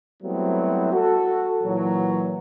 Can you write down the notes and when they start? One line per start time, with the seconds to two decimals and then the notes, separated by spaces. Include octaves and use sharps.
0.23 F#3 G3 A3 B3 C4 E4
0.93 F#4 A4
1.64 A#2 E3 F#3